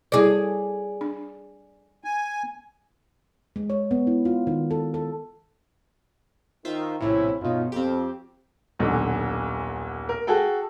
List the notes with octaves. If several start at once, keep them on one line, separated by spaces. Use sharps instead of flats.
G3 E4 G#4 D5 D6
D4
G#5
G#3
C#5
B3
E4
F4
D#3
A4
A4
D#3 F4 C5 E5
A#1 A2 C3 C4 C#4 E4
G1 B2 C#4 D#4 F4
F2 C4 G4
D#1 B1 D3
A#4
F#4 G#4 A4 G5